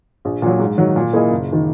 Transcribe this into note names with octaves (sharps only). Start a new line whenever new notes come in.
A#1
A#2 F#3
G#2
D#3 F#3
A#2
A#3 E4 G#4 D#5
F#1
D#3